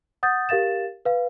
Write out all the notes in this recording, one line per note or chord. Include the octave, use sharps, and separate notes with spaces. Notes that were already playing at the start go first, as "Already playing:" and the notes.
F#5 D#6 G6 A6
G4 A#4 F5 A6 E7
B4 F5